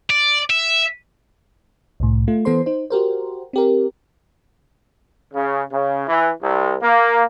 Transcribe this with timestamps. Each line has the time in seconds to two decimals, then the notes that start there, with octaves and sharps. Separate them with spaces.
0.10 D5
0.50 E5
2.00 C2 A2
2.28 A3 F4
2.45 E3 B3 A4 C5 C6
2.66 D#4 C5
2.90 F#4 G4 A#4 C5
3.53 C4 G4 A#4
5.33 C#3
5.71 C#3
6.08 E3
6.42 C2
6.82 A#3